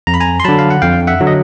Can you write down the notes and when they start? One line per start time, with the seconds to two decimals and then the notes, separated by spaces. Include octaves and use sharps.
0.07 F2 A#5
0.14 B5
0.20 G#5 A#5
0.40 C6
0.44 D3 F#3 A5 B5
0.59 F5
0.70 F#5
0.82 F2 F5 G5
1.07 E5 F#5
1.20 D3 F#3
1.27 D#5